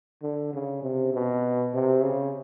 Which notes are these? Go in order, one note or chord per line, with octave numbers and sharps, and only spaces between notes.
D3
C#3
C3
B2
C3
C#3